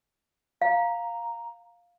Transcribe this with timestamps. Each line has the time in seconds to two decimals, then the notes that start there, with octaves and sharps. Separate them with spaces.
0.62 F5 A#5